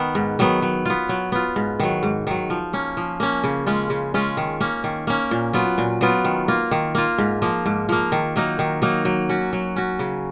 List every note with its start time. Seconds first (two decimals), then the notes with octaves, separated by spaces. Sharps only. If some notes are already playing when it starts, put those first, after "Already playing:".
Already playing: D#3 B3
0.15 G#2
0.39 D#3 F#3 B3
0.62 F#3
0.85 B3 F4
1.09 F#3
1.32 B3 F4
1.56 G#2
1.79 D#3 F#3
2.03 G#2
2.27 D#3 F#3
2.50 F3
2.73 A#3 C#4
2.97 F3
3.20 A#3 C#4
3.44 C#3
3.66 G#3 C#4 F4
3.90 C#3
4.14 G#3 C#4 F4
4.37 D#3
4.60 A#3 C#4
4.84 D#3
5.07 A#3 C#4
5.31 A#2
5.53 F#3 B3 F4
5.78 A#2
6.01 F#3 B3 F4
6.24 D#3
6.48 A#3 F4
6.71 D#3
6.95 A#3 F4
7.18 G#2
7.42 F3 A#3
7.66 G#2
7.89 F3 A#3
8.12 D#3
8.36 F#3 A#3 D#4
8.59 D#3
8.82 F#3 A#3 D#4
9.05 F#3
9.29 C#4 F#4
9.53 F#3
9.76 C#4 F#4
9.99 C#3